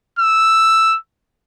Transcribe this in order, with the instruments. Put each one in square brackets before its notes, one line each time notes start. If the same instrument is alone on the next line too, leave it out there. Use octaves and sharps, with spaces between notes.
[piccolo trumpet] E6